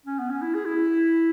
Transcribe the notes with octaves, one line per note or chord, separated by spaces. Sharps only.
C#4
B3
C#4
E4
G#4
E4